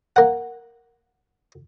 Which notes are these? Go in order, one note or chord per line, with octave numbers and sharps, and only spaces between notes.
A#3 F#5